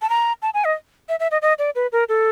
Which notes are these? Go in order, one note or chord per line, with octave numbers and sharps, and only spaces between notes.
A5
A#5
A5
G#5
D#5
E5
E5
D#5
D#5
D5
B4
A#4
A4